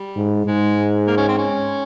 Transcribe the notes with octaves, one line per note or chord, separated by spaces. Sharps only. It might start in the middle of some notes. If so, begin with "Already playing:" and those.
Already playing: G3
G#2
G#2 G#3
A#3
C#4
C4
C#4